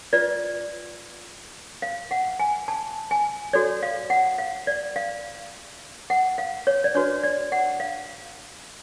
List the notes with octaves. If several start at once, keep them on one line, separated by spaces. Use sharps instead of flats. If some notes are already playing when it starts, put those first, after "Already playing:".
F4 B4 D5
F5
F#5
G#5
A5
G#5
F#4 A4 C#5 D5
F5
F#5
F5
D5
F5
F#5
F5
C#5
D5
D4 F#4 B4 C#5
D5
F#5
F5